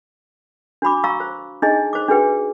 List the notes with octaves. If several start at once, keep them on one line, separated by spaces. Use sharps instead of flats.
D4 F#4 B5 D6
F5 A#5 C#6 E6
C5
D4 D#4 G#4 D#5
C5 D6
D4 F#4 G#4 B4 G5